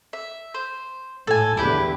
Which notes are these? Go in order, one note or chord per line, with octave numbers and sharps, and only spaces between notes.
E5
C5
A2 A4 G#5
E2 D3 E4 G4 B4